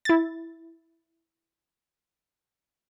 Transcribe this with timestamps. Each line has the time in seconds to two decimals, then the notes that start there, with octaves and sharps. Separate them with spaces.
0.05 E4 A6